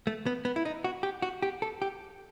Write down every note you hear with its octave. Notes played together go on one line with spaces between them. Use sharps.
A3
B3
B3
E4
D#4
F#4
G4
F#4
G4
A4
G4